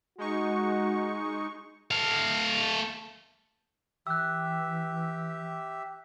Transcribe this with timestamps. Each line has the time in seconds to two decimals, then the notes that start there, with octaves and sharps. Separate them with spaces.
0.18 G#3 D#4 F#4 C#6
1.91 A3 F5
4.07 E3 G4 E5 E6 F#6